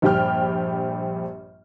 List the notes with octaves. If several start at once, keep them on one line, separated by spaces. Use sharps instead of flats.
A#1 G2 G4 G5 F6